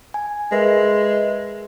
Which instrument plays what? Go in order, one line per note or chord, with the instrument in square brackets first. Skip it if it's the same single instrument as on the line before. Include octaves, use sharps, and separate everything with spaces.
[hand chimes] G#5
[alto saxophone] G#3 [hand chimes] A#4 B4 E5